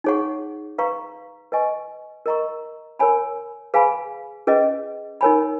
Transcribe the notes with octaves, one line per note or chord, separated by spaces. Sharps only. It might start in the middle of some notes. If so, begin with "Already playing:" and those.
D#4 G#4 C#5 F#5 C#6
B4 F5 A#5 C#6
B4 D#5 G#5 C#6
A#4 D#5 A#5 C#6
A#4 C#5 G#5 B5
G#4 B4 F5 G#5 B5
C#4 G#4 B4 D#5
D#4 A#4 C#5 G#5 B5